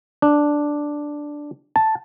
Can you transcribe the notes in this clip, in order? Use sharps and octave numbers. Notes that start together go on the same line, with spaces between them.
D4
A5